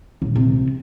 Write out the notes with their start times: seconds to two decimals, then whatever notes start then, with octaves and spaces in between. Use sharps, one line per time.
0.22 D#1
0.36 C3